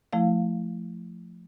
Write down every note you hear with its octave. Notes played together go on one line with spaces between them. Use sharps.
F3 A3 E4 F5